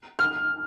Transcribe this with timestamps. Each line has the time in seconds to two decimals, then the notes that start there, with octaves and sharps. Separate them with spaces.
0.19 F6